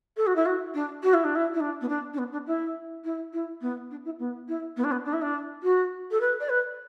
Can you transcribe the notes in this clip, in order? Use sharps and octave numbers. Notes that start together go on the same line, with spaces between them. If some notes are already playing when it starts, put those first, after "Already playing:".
A4
F#4
E4
F#4
D4
F#4
E4
D4
E4
E4
D4
B3
D4
D4
B3
D4
E4
E4
E4
B3
D4
E4
B3
E4
B3
D4
B3
D4
E4
D4
F#4
A4
B4
D5
B4